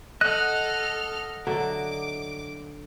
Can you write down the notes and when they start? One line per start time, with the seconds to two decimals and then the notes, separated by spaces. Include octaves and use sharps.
0.21 A4 D#5 F#5 F6 F#6
1.47 D3 F#3 E5 D6